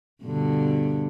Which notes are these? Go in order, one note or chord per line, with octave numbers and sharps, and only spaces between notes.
G2 B2 D3